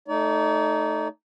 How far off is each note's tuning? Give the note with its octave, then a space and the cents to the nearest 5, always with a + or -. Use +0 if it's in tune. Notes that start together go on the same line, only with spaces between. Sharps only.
A3 +0 D#4 +0 D5 -45